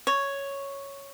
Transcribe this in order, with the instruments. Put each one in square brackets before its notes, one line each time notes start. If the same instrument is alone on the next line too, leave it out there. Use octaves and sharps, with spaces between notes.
[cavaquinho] C#5